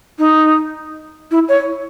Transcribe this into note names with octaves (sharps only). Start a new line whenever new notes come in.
D#4
E4
C#5